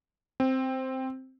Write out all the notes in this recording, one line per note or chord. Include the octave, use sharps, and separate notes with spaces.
C4